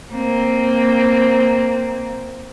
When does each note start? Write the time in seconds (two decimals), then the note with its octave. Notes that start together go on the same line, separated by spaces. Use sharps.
0.13 A#3 C4